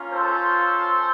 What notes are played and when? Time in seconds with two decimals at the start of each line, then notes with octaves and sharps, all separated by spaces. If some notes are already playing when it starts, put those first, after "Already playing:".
Already playing: A#3 C#4 F4
0.11 A4 C5